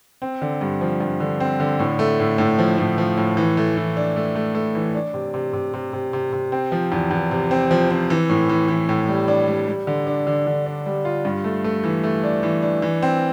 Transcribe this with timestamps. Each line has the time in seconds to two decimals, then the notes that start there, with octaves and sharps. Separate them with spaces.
0.22 C4
0.42 D3
0.61 G2
0.81 F3
1.00 G2
1.20 D3
1.40 C4
1.60 D3
1.79 A2
1.99 A3
2.19 A2
2.38 A2
2.59 F3
2.78 A2
2.98 F3
3.17 A2
3.37 E3
3.57 A3
3.77 E3
3.97 D4
4.16 A3
4.35 A3
4.55 A3
4.75 E3
4.95 D4
5.14 C3
5.34 C3
5.53 C3
5.74 C3
5.93 C3
6.13 C3
6.33 C3
6.52 C4
6.72 F3
6.92 E2
7.11 E2
7.31 C3
7.51 C4
7.71 F3
7.90 C4
8.10 E3
8.30 A2
8.49 E3
8.68 E3
8.89 A2
9.09 G3
9.28 D4
9.48 G3
9.67 G3
9.87 D3
10.07 D4
10.27 D3
10.47 D3
10.66 D4
10.86 G3
11.05 F4
11.25 G2
11.44 A3
11.64 A3
11.84 E3
12.04 A3
12.24 D4
12.43 E3
12.62 D4
12.82 E3
13.02 C4